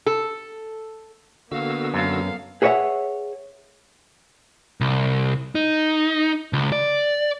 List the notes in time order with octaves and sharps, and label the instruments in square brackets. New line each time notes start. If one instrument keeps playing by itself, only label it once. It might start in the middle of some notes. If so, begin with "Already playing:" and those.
[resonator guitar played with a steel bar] A4
[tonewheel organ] D3 F#4 E6 [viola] A#3 B3 [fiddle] F5
[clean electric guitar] F#2 [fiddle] A4 F5
[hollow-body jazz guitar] G#4 B4 C#5 D5 E5 F#5
[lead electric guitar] C2
D#4
C#2
D5